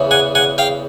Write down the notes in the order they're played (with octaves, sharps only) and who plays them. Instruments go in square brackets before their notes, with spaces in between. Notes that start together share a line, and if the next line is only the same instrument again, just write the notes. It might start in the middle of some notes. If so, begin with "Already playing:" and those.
Already playing: [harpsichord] E2 C#3 E3
F#5 G#5
F#5 G#5
F5 G5